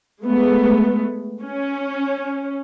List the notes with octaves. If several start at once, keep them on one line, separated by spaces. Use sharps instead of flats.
G#3 A3 B3
C#4